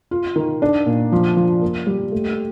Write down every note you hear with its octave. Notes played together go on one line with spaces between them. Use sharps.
F4
D#3
D4
A#2
F3
F3
A#3
G3
A3